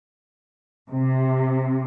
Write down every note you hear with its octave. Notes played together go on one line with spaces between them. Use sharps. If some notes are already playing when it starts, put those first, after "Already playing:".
C3